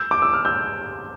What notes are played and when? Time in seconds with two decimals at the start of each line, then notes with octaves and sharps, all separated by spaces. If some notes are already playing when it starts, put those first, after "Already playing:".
Already playing: E6 G6
0.11 D6
0.22 E6
0.33 F6
0.45 E6 G6